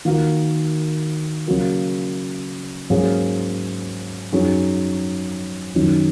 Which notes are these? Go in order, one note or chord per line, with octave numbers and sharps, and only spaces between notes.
D#3 A#3 F#4 A#4
C#3 F#3 A#3 F#4 A#4
G#2 F#3 A#3 C#4 G#4
F#2 F#3 D#4 G#4
F#2 D#3 F#3 D#4